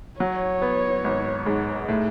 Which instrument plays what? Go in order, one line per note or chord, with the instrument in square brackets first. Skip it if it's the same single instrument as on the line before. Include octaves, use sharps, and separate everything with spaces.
[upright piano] F#3 [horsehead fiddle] C#5
[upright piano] B3
G#1
G#2
A2